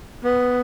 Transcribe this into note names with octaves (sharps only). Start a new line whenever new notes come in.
B3